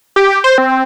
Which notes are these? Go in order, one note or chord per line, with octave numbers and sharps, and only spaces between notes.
G4
C5
C4